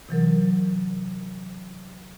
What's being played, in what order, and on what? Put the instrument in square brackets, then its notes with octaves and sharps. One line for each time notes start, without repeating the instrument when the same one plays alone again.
[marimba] C3 E3 F#3 A#4